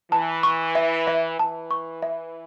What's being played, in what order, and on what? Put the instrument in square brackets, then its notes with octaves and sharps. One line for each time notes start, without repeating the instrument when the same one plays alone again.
[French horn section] E3 [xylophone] A5
[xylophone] C#6
E5
E5
[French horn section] E3 [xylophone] A5
[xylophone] C#6
E5